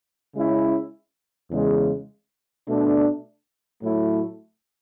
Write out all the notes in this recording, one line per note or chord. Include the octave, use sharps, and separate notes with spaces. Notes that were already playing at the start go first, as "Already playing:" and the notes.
C#3 G#3 C#4 E4
E2 C#3 G#3
B2 A3 D4
A2 F#3 A3 E4